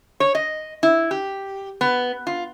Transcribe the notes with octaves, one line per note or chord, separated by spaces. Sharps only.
C#5
D#5
E4
G4
B3
F4